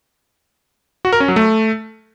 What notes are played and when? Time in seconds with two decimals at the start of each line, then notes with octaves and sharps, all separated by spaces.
1.05 F#4
1.13 A#4
1.20 C#4
1.28 F#3
1.36 A3